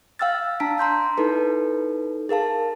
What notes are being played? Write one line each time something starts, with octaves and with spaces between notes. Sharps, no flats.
F5 G5 E6 F6 A6
D4 A5 A#5 B6 D7
A#5 C6 G6 B6
D#4 E4 A4 B4
G#4 A#4 F5 A5